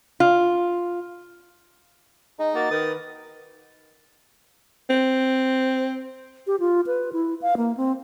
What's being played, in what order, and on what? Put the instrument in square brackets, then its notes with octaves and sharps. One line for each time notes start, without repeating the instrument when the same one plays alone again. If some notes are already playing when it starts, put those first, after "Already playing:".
[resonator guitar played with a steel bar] F4
[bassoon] G#3 [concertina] D#4
[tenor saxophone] A#3 [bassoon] F#4 [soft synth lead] A6
[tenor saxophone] D#3 [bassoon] B4 [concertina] D#6
[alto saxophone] C4
[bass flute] G4
F4
B4
E4
F5
A#3
C4